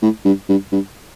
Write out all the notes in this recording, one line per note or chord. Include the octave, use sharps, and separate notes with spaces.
A2
G2
G2
G2